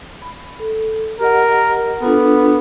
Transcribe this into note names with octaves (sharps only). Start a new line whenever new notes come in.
B5
A4
G4 A#4 D#5 F#5
B3 D4 F4 A4